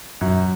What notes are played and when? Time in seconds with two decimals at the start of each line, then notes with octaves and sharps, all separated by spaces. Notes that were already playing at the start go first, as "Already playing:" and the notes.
0.21 F#2